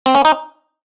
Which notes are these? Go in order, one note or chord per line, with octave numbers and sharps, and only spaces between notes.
C4
C#4
D#4